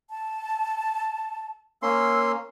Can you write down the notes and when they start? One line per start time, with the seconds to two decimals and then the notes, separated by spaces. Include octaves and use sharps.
0.10 A5
1.83 A#3 C#4 C6 E6